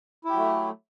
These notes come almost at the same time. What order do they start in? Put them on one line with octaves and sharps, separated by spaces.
E4 G4 F#3 A3